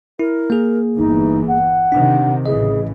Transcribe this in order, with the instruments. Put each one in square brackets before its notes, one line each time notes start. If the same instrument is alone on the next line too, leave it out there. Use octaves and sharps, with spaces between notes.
[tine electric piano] E4 [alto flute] A#4
[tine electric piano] A#3 G#4
[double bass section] G1 E2 E3 [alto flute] D#4
[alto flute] F#5
[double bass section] C3 D#3 [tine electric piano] D4
[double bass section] A1 C#3 E3 [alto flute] G#4 [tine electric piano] D#5